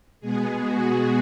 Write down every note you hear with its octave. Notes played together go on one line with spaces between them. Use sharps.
B2 G#3 B3 G#4
F#4